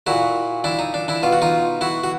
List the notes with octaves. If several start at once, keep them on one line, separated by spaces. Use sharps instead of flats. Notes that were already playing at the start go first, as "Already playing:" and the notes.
A#2 E4 F#4
D4 E4
D#4
D4
D4 E4
B2 F4
F#4
D#4 F4
E4 F#4
F#4